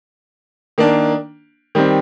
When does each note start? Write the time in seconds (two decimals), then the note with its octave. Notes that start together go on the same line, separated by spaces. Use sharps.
0.78 D#3 A#3 D4
1.75 D#3 G3 C4